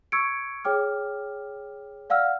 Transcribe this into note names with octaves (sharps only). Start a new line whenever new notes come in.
C#6 E6 G#6 C#7 D7
G#4 C#5 G5 D6 F6
D5 F5 F#5 E6 F6